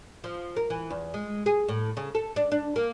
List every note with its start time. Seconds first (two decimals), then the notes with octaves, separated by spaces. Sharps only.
0.24 F3
0.57 A#4
0.70 E3
0.90 E2
1.14 G#3
1.46 G#4
1.68 A2
1.97 C#3
2.15 A4
2.36 D4
2.52 D4
2.76 A#3